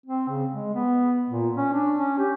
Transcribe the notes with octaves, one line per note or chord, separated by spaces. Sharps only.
C4
C#3
G#3
B3
A#2
C#4
D4
C#4
G4